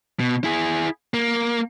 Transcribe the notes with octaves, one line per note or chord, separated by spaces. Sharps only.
B2
E4 G#4
A#3